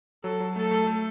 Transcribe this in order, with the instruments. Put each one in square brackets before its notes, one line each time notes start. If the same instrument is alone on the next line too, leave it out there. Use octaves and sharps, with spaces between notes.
[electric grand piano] F#3 [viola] A4
[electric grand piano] F#3
[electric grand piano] A3 [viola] A4
[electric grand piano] A3
A3